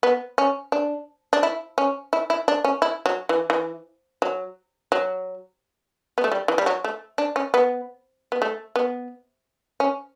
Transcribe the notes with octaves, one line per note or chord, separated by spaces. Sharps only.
B3
C#4
D4
D4
E4
C#4
E4
E4
D4
C#4
E4
F#3
E3
E3
F#3
F#3
B3
A3
G3
E3
G3
F#3
A3
D4
C#4
B3
B3
A3
B3
C#4